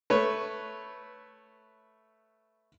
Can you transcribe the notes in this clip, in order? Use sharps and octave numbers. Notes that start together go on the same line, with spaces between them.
A3 B4 C#5